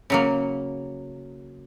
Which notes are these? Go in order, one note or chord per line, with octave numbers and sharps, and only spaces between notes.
C#3 F#3 A#3